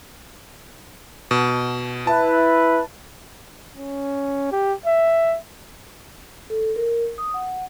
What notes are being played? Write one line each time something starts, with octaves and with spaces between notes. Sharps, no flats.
B2
E4 B4 A5
C#4
G4
E5
A4
A#4
D#6
F#5